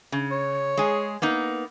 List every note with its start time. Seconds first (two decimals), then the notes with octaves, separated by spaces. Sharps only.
0.12 C#3
0.31 C#5
0.77 G#3 G#4
1.22 A#3 B3 D#4